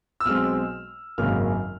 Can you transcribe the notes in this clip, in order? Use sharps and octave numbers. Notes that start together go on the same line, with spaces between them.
E6
B1 B2 G#3 C4 F6
G#1 F#2 C#3 F#3 A#3 F6